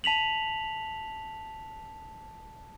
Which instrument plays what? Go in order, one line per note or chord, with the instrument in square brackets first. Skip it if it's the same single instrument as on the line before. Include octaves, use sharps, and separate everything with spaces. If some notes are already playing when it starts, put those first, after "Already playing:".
[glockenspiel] A5 B6 F7 F#7